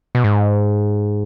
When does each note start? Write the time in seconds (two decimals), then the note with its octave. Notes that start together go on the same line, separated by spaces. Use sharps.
0.15 B2
0.24 G#2